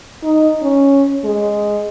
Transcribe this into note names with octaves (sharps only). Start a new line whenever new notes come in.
D#4
C#4
G#3